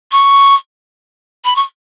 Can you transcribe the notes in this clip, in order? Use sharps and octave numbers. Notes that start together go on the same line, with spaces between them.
C#6
B5
C#6